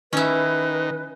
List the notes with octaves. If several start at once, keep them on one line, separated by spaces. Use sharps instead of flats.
D#3 C#4 E4 B4